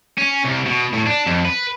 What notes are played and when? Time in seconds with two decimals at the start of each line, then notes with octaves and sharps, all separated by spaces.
0.18 C#4
0.45 C2
0.66 B2
0.93 A2
1.06 D4
1.26 F2
1.45 B4